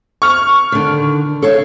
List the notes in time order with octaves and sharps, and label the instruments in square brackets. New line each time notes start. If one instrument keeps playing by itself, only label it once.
[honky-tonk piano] C#6 F6
[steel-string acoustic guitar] D3 D#3
A4 C#5 F5